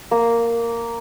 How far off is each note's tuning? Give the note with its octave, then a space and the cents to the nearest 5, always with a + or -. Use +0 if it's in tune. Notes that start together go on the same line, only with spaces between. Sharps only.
A#3 -5